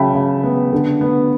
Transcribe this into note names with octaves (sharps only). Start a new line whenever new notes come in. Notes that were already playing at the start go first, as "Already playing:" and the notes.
Already playing: C#3 F#3 E5 G5 A5 B5
C#3
B3
D3
B3